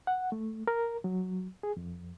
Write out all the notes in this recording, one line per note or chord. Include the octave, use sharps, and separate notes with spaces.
F#5
A3
A#4
F#3
G#4
F2